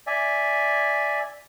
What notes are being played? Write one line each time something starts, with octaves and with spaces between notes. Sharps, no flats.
D5 E5 G#5